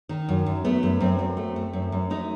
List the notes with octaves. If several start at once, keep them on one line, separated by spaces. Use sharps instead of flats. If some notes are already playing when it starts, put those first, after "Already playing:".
D#3
F#2
F#2
A3 B3
F#2
F#2 C4
F#2
A3
A3
F#2
F#2
A3 D#4